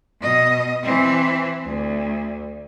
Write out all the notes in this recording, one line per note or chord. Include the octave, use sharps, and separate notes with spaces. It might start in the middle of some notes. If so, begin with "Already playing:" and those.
B2 D#5
E3 C4
D2